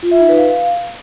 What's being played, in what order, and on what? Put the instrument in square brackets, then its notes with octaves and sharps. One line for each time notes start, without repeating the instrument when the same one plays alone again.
[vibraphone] F4
E5
D#4
B4
F5